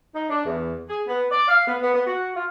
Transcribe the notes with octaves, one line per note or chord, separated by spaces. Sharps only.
D#4
D4
E2
G#4
B3
D5
F5
B3
B3
B3
F#4
F4